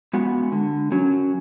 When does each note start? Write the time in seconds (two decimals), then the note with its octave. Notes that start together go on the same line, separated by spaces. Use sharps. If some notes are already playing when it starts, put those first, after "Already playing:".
0.13 G#3 B3 F#4
0.52 D3
0.92 F#3 C#4